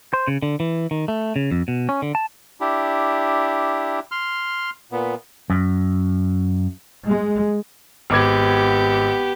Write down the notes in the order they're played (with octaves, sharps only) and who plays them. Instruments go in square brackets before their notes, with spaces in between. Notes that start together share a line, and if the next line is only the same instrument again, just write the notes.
[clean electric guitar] C5
C#3
D3
E3
D#3
A3
C#3
F2
B2
C#4
D3
A5
[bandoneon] D4 E4 G4
C6 F6
A#2 B3
[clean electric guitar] F#2
[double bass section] G#3
[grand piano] G#1 D6 G#6 [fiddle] B3 G4